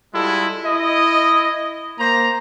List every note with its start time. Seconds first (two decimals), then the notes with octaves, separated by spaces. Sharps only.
0.14 G3 G#3 E4 F4 A4
0.65 E4 D#5
1.99 A#3 C5 A#5